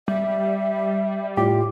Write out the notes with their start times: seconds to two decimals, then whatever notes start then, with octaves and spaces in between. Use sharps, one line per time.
0.08 G3 E5
1.37 A2 F4 G4